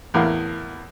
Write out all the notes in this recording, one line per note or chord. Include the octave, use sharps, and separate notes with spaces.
E2 A2 A#4 F5